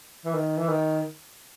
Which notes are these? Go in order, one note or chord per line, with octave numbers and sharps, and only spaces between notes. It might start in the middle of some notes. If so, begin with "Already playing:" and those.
E3
D#3
E3
D#3